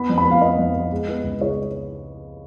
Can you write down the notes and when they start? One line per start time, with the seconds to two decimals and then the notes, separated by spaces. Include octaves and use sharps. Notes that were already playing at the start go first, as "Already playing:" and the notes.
Already playing: B3 B5
0.09 F2
0.18 B5
0.25 B3
0.31 F5
0.41 B3 D#5
0.59 F2
0.75 B3
0.92 G#3
1.09 B3
1.24 C#2
1.40 G#3 C#5